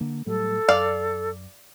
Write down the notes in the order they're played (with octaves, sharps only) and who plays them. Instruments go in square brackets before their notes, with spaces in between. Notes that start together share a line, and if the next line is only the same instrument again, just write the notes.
[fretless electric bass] D3 A#3
[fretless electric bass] A2 F#3 G3 [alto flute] A4
[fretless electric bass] F#2 [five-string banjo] D5 F5